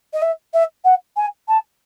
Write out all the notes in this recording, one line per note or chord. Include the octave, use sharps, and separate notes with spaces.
D#5
E5
E5
F#5
G#5
A5